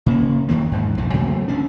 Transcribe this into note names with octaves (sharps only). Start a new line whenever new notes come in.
C#3 A#3 C#4
D#2 D#3 F#3 A#3
E2 G#2
B1 F2 E3
C3 F#3 A3 A#3
D2 A#3 C#4 D4